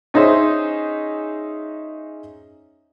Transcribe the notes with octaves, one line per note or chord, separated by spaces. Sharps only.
C#4 D#4 G#4 C5 E5